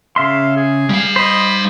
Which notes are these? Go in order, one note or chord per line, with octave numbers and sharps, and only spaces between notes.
C#3 E5 F5 C6
G#4
G3 F5
C5 D#5 B5